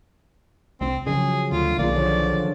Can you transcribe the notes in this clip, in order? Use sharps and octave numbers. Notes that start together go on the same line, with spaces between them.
C2 C4
C#3 F3 F#3 C#4 G#4
D2 F4
B1 D#3 A#3 D4 F4 G#4 D5
D3 F3 C#5